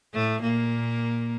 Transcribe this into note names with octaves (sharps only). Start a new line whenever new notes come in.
A2 A3
A#2 A#3